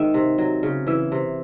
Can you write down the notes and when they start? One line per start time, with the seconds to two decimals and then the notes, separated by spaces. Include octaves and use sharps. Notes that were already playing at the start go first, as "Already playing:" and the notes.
Already playing: G#2 D#3 E5
0.14 C3
0.38 F#3
0.63 C#3
0.87 E3 E5
1.12 C3